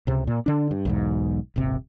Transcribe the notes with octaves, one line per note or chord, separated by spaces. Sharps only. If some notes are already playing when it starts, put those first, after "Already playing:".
C#2 C3
A#2
D3 D4
G2
B1 E2 G#2
D#1 G#1 C3